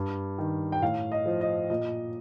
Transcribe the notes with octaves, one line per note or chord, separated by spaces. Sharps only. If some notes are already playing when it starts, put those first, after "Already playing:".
Already playing: G2
D#3
G5
A2 F5
D#5
F3
D#5
A#2 D#5